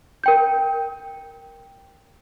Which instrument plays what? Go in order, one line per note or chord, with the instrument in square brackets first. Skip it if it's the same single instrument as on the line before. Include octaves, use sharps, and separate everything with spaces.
[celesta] A#4 G5 G6